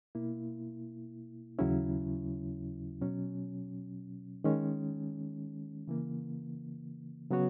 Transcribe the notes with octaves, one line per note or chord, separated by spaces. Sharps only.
B2 A#3 E4
D#2 C#3 F#3 C#4 E4
B2 F#3 C#4
D#3 G#3 C#4
C#3 E3 A#3
C#3 F#3 B3 F#4 C#5